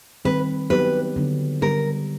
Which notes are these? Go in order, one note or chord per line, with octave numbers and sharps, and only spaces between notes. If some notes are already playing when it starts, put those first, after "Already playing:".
D#3 G3 C4 B4
F#3 B3 D#4 G4 B4
D3 F#3 B3 D4
D3 G3 B3 D4 G4 A#4